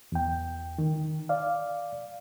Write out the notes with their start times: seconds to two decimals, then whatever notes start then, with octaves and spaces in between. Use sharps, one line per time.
0.12 E2 G5
0.78 D#3
1.29 D5 F5